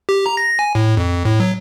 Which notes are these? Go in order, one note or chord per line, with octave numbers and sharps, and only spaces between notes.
G4
A#5
A#6
G#5
A2
F2
A2
F#3